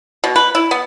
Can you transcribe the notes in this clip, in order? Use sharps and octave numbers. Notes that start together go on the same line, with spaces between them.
B2
B4
E4
B3